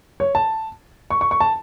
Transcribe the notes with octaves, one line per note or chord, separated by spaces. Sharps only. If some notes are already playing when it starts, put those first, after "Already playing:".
C#5
A5
C#6
C#6
C#6
A5